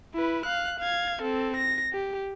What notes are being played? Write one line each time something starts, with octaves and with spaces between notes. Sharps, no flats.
E4 B4
F5 F#6
F5 G#6
C4 A4
A#6
G4